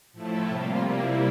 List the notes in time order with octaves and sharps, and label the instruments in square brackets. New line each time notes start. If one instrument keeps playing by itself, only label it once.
[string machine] A2 F3 A3 E4 A4
C3 G3 A#3 F4
C3 G3 A#3 E4